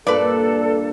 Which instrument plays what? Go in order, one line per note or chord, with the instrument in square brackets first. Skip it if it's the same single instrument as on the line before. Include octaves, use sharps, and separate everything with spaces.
[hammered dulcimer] G2 A#2 [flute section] A4 [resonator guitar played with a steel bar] B4 D5